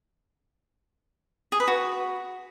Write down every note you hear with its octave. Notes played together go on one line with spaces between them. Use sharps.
G#4
B4
F#4